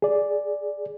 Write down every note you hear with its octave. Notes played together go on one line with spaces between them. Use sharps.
G#4 D5